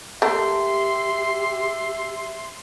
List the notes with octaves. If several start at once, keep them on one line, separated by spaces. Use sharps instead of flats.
A3 A#3 G4 E5 C6